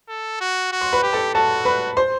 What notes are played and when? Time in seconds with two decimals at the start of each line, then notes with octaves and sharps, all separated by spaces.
0.09 A4
0.40 F#4
0.72 F#4
0.81 C6
0.93 B4 B5
1.03 G4
1.13 A4 A5
1.35 F#4 A4 A5
1.65 B4 B5
1.97 C5 C6